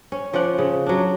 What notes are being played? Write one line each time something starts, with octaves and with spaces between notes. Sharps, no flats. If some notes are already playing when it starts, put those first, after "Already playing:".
C#4
F3 C#4 D5 F#5
C#3
F#3 D4